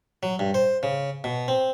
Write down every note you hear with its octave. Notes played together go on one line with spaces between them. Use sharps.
F#3
G2
C5
C#3
B2
C4